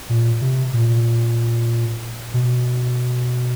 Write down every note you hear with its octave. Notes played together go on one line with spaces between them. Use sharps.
A#2
C3
A#2
B2